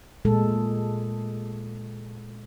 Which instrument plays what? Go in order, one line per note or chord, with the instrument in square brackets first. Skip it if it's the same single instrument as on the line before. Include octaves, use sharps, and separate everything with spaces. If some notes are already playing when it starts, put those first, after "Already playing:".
[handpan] A#2 G#3 A4